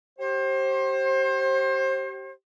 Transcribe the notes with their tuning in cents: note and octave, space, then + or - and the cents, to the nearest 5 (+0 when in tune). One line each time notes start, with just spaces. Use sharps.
G4 -30 C5 +30